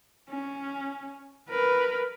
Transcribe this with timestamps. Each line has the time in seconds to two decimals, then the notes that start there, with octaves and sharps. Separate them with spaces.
0.29 C#4
1.50 A#4 B4